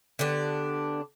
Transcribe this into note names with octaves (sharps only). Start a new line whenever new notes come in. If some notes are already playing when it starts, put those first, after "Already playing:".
D3 B3 D4 G4